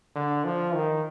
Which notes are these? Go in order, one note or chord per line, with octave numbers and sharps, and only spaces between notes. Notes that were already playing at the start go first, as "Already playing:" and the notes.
D3
F3
D#3